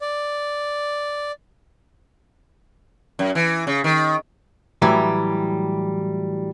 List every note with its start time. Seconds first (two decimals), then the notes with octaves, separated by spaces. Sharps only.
0.01 D5
3.19 F#2
3.35 E3
3.67 C#3
3.84 D#3
4.82 A2 E3 F#3 G3